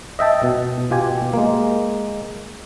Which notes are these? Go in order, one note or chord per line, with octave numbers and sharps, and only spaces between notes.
D#5 E5 G5 A5
B2
B2 F4 G4 G#5
G#3 A#3